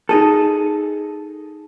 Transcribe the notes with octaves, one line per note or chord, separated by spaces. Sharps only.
D#4 G#4 A4